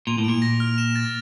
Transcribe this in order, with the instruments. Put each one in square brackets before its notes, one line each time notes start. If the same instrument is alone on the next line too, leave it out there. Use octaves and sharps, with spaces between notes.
[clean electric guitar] A#2 [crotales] F7
[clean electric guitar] A2
[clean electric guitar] A#2 [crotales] D7
[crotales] A#6
F6
E7
A6